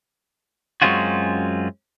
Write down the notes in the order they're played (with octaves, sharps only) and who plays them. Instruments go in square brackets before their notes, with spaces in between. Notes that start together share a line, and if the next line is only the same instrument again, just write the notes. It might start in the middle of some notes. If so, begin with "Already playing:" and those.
[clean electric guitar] F#2 G#3 C4 C#4 F4 F#4